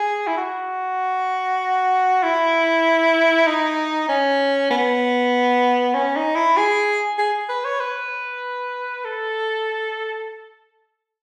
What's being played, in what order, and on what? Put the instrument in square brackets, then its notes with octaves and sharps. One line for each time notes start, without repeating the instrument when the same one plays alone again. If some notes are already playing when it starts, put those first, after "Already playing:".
Already playing: [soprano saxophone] G#4
E4
F#4
E4
D#4
C#4
B3
C#4
D#4
E4
G#4
G#4
B4
C#5
B4
A4